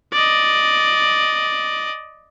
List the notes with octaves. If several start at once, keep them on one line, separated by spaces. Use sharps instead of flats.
D5 D#5